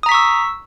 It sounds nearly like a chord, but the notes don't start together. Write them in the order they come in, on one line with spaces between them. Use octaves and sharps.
D#6 A#5 B6 C#6 E6